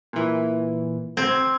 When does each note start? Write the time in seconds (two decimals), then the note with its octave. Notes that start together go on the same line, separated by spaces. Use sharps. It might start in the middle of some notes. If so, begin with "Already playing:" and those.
0.13 A#2 E3
1.17 C4 G#6